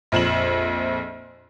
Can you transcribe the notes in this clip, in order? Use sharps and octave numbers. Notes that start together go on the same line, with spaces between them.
A#1 F2 E7 F#7